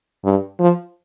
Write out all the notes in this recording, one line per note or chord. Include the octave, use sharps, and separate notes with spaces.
G2
F3